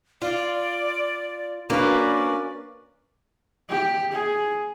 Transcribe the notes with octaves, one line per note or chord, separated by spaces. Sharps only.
F4 D5
A#3 C#4 D4 F#4 A#4 B4 D5
G4
G#4